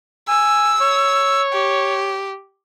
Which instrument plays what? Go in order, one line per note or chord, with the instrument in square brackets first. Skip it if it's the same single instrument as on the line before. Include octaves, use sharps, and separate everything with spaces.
[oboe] G#5 [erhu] E6
[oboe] C#5
[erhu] G4